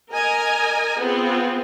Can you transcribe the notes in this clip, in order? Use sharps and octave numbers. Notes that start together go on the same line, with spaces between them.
A#4 D#5 G#5 A#5
B3 C4 F4 G#4